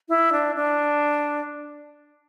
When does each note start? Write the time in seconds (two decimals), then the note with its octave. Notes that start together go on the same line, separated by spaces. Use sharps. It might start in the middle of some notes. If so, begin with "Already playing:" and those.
0.09 E4
0.32 D4
0.56 D4